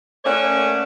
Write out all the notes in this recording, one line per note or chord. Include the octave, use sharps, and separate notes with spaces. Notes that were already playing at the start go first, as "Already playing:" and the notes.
A3 A#3 C#4 C#5 D5 F#5